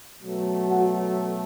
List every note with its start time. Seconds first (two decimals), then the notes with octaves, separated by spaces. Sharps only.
0.21 B2 F#3 A3
0.68 F#4